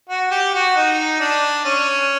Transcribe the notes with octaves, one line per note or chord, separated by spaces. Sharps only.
F#4
G4
F#4
D#4
D4
C#4